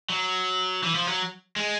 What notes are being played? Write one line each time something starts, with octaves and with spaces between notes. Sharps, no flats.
F#3
E3
F3
F#3
G#3